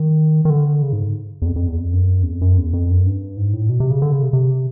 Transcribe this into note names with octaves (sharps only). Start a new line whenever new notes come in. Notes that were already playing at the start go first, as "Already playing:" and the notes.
Already playing: D#3
D#3
D3
C#3
G#2
E2
F2
F2
E2
F2
F#2
E2
F2
F#2
E2
F2
F#2
G2
G#2
A2
B2
C3
C#3
D3
C#3
C3
C3